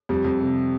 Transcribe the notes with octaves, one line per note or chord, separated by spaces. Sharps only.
F2 G3
F2
C3